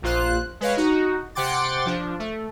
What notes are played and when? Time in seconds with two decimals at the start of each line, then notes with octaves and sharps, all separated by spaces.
0.02 A#1 A#2 F4 C5 F#6
0.60 G#3 B4 C#5 F5
0.77 D#4 F#4
1.35 C3 F#5 G5 C6 D6 A6
1.86 F3 D4
2.19 A3